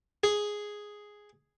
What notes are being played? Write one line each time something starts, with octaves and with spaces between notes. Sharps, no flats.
G#4